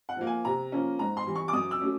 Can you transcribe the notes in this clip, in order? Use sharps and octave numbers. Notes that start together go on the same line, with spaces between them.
F#5
F3 A#3
G#5
C3 A#5
F3 A#3 C#4
G#2 A#5
C6
E3 G3
C#6
D6
F#2 D#6
E6
F#3 A3 C#4